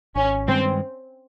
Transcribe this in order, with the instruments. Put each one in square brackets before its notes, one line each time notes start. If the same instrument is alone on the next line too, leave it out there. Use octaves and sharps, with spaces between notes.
[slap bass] G#1 [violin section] C#4
[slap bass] G2 D#3 G#3 [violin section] C4